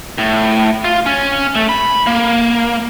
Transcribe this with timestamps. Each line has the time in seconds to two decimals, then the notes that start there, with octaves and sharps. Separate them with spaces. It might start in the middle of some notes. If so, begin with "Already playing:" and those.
0.18 A2
0.85 F4
1.06 C#4
1.55 A3
1.69 B5
2.07 A#3